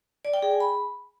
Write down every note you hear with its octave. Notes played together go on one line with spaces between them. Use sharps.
D5
G5
G#4
G#5
B5